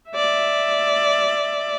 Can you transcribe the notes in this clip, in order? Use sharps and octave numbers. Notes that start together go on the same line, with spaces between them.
D5 E5